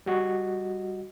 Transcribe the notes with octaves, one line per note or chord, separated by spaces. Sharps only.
G3 F#4 D#5